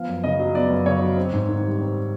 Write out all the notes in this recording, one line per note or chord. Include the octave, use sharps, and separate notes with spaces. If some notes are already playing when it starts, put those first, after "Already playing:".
Already playing: F3 B3 F5
F#2
C#3 D#5
F#3
B3 D5
F#2
C#3 C#5
F#3
C4
G#2
D#3
G3
C4